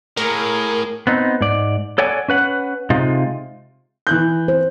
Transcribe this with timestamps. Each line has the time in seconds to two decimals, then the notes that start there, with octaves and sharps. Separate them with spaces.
0.17 A2 A#3 G#4 A#4
1.07 B3 C4 D#4
1.41 G#2 D5
1.98 A4 C#5 D5 F#5 G#5
2.28 C#4 B4 F#5
2.90 C3 G#3 D#4 F4
4.07 E3 F#6 G6
4.48 C5